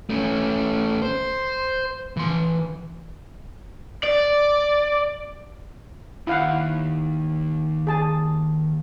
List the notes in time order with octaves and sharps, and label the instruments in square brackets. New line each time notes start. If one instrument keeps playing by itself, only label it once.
[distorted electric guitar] A3 C#4
C5
E3 C6
[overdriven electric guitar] D5
[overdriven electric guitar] D#2 [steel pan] E4 F5 F#5
[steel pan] G#4 A5